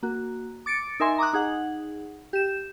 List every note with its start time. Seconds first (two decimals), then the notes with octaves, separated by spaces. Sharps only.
0.03 A#3 F#4
0.66 D6 A6 C#7 D7
1.00 D#4 A#4 E5 G#5 C6
1.18 A#5 D6 D#6 F#6
1.33 D#4 G#4 F#5
2.33 G4 E7